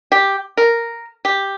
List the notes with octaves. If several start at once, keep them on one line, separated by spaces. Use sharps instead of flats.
G4
A#4
G4